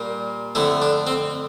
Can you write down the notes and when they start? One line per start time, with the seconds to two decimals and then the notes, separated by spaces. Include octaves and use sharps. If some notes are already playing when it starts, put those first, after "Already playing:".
Already playing: A#2 G3 A#3
0.55 F2 D3 A3 E4
0.82 D4
1.07 C4